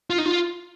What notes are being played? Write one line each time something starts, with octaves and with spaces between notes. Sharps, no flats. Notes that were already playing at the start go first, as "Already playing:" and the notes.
F4
D#4
F4